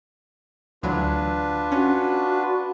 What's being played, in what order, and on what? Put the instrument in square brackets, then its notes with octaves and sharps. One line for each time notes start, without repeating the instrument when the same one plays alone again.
[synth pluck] D2 E3 F#3 [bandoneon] D4 F4 B4
[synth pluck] C#4 [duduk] F#4